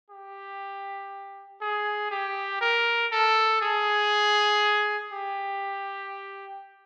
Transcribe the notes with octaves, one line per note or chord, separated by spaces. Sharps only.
G4
G#4
G4
A#4
A4
G#4
G4